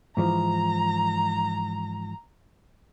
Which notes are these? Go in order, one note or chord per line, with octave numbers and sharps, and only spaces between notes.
G#2 E3 F3 A#5